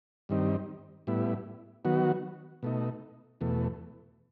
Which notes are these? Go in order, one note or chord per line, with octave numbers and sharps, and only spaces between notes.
G2 D#3 G3 C4 D#4
A2 G3 B3 E4
D#3 F#3 B3 F#4
B2 A3 D#4
E2 B2 A3